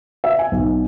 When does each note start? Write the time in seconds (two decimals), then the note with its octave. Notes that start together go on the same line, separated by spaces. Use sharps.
0.24 E5
0.39 G#5
0.52 B1